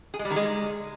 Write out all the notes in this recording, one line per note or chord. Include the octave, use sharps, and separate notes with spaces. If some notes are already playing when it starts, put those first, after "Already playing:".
G#4
G#3
G3
D#3
G#3